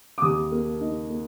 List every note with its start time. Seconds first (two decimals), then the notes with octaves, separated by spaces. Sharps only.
0.18 D6
0.22 D#2 D#6
0.52 A#3
0.81 D#4
1.10 A#3